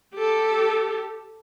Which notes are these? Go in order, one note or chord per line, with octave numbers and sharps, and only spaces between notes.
G4 A4